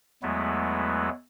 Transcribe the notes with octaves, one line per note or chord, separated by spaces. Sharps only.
E2 F#3 G#3 A3 B3 E4